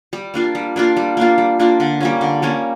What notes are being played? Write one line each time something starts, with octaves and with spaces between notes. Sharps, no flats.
G3
A#3 D4 F4
G3
A#3 D4 F4
G3
A#3 D4 F4
G3
A#3 D4 F4
D3
G3 A#3 C#4
D3
G3 A#3 C#4